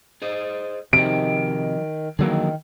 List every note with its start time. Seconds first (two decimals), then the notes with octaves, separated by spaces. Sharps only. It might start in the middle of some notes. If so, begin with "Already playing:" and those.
0.22 G#4 C5 D#5
0.93 C3 D#3 F3 F#4 D#5 D7
2.19 D3 D#3 F3 F#3 A#3 E4 G#4